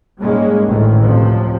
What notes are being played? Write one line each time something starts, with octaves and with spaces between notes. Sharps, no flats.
G#2 G3 G#3 A#3 C#4
A1 D2 A2 D#3 E3
A1 D2 C3 F3